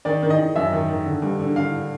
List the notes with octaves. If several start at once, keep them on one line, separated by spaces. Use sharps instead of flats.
D#3 D5
D#3
D#5
D#3
F#2 E5
D#3
D#3
D3
G2
D3
D3 F5